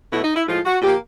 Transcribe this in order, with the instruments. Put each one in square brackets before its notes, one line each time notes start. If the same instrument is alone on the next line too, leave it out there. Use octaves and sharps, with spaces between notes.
[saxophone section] B2 F#3 A3 E4
D#4
E4
A2 F3 G#3 F4
F#4
A#2 F3 A#3 G4